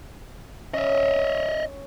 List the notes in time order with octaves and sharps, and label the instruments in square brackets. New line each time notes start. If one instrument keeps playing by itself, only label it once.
[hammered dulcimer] C#4 [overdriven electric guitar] D#5 E5